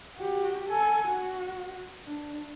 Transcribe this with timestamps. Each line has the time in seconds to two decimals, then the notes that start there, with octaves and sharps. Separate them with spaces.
0.18 F#4 G4
0.68 A4 G#5
1.08 F#4
2.06 D4